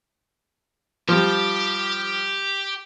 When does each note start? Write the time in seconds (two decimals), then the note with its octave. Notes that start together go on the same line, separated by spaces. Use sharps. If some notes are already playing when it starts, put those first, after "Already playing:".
1.08 F3 G3 G4 G5